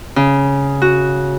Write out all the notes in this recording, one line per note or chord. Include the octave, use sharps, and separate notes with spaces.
C#3
F#4